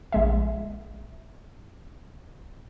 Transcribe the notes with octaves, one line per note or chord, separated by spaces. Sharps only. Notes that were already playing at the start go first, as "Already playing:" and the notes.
A#1 G#3 E5